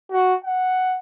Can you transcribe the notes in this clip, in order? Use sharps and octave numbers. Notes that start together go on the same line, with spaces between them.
F#4
F#5